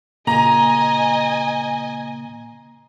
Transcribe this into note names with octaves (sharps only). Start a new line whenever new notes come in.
A#2 C#3 A#3 D#5 G#5 A#5